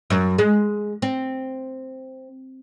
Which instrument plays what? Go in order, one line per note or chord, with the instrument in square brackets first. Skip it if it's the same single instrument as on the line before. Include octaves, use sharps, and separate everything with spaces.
[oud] F#2
G#3
C4